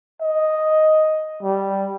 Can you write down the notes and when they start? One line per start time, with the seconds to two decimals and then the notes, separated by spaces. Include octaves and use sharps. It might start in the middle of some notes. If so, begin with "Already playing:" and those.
0.22 D#5
1.43 G3